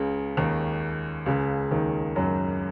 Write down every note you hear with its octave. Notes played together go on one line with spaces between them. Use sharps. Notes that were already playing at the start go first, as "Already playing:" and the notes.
Already playing: C#2 C#3
D#2 D#3
C#2 C#3
D#2 D#3
F#2 F#3